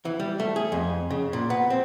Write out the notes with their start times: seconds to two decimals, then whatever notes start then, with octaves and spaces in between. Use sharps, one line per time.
0.05 E3
0.20 G3
0.40 A3
0.56 G#4
0.72 F2
1.10 C#3
1.33 A#2
1.50 B3
1.70 C4